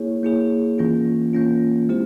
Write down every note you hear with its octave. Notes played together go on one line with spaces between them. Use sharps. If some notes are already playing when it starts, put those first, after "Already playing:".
Already playing: A#3 E4 G#4 C#5
A#3 E4 G#4 C#5
E3 A#3 C#4 F4
E3 A#3 C#4 F4
G#3 C4 E4 G4 C5